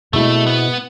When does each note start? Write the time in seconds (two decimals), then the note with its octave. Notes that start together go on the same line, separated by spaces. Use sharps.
0.13 B2 G#3 A3 C4 E4
0.47 B3